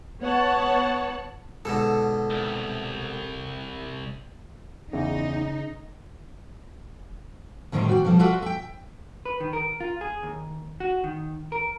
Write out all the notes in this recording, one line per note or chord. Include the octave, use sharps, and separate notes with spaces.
B3 C#5 F#5 A5
G#2 B2 D3 A4
C2
E2 C#3 D#4
D2 A2 D#3 G3 D#4 C5
F#4 D5 G5
B2 F3 G3 A4
F4 F#4 A4 D5 E5 F#5
E5 G5
B4
D#3
A#4
F4
G#4
D#2
F#4
D#3
A#4